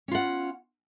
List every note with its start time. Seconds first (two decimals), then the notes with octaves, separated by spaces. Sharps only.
0.08 C#4
0.11 F4
0.15 F#5